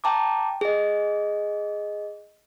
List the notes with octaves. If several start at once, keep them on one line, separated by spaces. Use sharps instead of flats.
G5 A5 A#5 D6
G#4 D#5